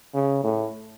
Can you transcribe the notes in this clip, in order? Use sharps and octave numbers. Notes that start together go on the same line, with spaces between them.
C#3
A2